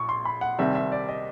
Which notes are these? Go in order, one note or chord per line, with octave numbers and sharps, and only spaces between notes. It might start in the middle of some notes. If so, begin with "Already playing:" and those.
Already playing: A#1 A#2 C#6
C6
B5
F#5
C2 C3 D#3 G3 C4 E5
E5
D5
D#5